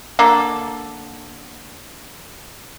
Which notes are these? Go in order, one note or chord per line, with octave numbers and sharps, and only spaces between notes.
D3 A#3 A4